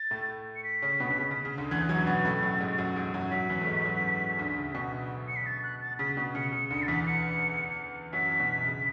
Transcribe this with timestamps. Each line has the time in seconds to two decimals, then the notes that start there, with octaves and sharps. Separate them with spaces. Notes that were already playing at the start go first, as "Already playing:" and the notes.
Already playing: A6
0.11 A2 A3
0.56 C#7
0.64 B6
0.82 C#3 C#4
1.00 B2 B3
1.10 B2
1.18 C#3
1.31 C#3
1.45 C#3
1.58 D2 D3
1.71 E2 E3 G#6
1.82 F#6
1.89 F#2 F#3 G#6
2.06 B2 B3 A6
2.25 A2 A3
2.43 F#2 F#3
2.60 G#2 G#3
2.78 F#2 F#3
2.96 G#2 G#3
3.14 F#2 F#3
3.31 F#2 F#3 B6
3.50 E2 E3
3.61 A3
3.67 G#2 G#3
3.85 F#2 F#3
4.38 D2 D3
4.57 C#3
4.75 B2
5.28 C#7
5.36 B6
5.46 A6
5.63 F#6
5.81 A6
5.99 C#3 B6
6.17 B2 B6
6.35 C#3 C#7
6.53 C#3 C#7
6.70 D2 D3 C#7
6.83 A6
6.88 E2 E3 B6
7.07 C#7
8.13 F#2 F#3 B6
8.40 B2
8.67 C#3